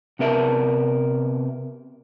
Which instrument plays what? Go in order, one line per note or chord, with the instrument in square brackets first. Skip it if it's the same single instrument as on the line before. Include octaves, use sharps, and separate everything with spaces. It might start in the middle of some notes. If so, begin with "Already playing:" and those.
[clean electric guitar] C3 B3 A#4 E5